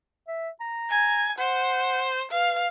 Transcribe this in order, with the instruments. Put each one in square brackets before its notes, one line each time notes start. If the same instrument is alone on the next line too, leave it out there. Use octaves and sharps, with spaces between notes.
[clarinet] E5
A#5
[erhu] G#5
[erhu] C5 [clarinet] F#5
[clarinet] B4 [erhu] F5